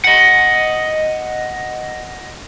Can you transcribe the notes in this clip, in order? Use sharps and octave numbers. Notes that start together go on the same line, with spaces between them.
D#5 F#5